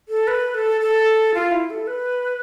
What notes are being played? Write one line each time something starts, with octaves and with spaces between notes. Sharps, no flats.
A4
B4
A4
A4
F4
E4
A4
B4